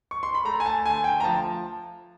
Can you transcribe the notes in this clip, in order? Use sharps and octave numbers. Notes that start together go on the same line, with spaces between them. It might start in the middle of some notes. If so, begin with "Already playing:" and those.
C#6
C6
B5
A3 A#5
G#5
A5
D2 G#5
G5
A#5
F3 A5